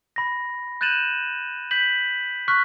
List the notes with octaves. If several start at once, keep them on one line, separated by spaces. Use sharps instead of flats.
B5 A#6
F#6 G6 A6 D#7 E7 F#7
G6 B6 F#7
C#6 F6 F#6 B6